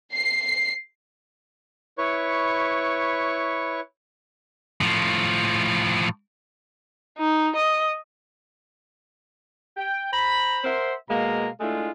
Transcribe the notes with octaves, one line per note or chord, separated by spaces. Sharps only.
C7
E4 B4 C#5 C#6
A2 F3
D#4
D#5
G5
C5 A#5 B5
A#4 C5 E5 F#5 C6
B2 G#3 A#3 F5 A#5
G#3 A3 D4 E4 F4